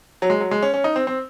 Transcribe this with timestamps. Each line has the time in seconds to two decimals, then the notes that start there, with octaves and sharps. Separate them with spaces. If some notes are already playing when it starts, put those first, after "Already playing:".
0.22 F#3
0.30 G#3
0.41 F#3
0.51 G#3
0.62 C#4
0.74 C#4
0.84 D#4
0.96 C4
1.07 C4